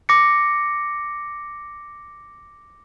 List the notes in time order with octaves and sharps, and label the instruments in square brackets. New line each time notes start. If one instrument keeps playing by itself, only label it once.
[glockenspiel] D6 A#6 C#7